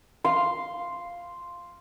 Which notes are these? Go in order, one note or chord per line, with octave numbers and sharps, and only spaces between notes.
F5 C6